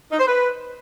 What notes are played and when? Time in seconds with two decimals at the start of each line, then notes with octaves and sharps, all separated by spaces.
0.12 D#4
0.20 C5
0.27 B4